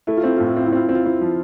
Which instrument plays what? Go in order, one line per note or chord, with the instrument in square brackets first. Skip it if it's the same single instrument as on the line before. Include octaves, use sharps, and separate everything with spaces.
[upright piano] A3 [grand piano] E4
[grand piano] F4
[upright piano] C4 [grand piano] E4
[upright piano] A2 [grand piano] F4
[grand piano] E4
[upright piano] C4 [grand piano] F4
[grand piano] E4
[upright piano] C4 [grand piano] F4
[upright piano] C4 [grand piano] E4
[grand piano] F4
[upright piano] C4 [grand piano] E4
[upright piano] F3